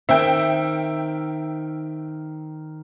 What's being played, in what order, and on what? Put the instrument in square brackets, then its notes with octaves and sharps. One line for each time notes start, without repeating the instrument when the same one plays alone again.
[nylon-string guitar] D#3 C4 [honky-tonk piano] E5 G5